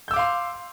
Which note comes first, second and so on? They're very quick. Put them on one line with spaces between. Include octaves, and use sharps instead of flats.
G6 E6 D6 F5 C6